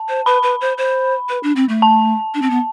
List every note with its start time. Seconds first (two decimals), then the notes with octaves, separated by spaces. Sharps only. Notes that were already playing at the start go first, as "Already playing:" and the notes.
Already playing: A5
0.09 C5
0.26 B4 B5
0.43 B4
0.61 C5
0.78 C5
1.29 B4
1.43 D4
1.56 C4
1.69 A3
1.82 A5
2.34 D4
2.42 C4
2.50 B3